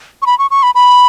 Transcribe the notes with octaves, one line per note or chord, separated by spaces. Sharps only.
C#6
B5
C#6
C#6
B5
B5